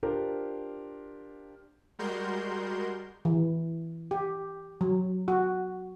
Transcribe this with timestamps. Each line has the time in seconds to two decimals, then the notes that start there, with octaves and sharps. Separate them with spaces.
0.03 D4 F4 G4 A#4 C5
1.99 G3 G#3 F#4 A#4 C6 G6
3.25 E3
4.11 G4
4.81 F#3
5.28 F#4